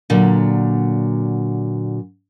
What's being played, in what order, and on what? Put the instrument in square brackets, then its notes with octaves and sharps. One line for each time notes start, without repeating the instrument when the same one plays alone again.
[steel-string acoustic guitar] A#2 D3 F#3